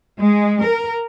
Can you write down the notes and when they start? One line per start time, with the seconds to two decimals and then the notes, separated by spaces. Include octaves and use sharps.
0.20 G#3
0.63 A#4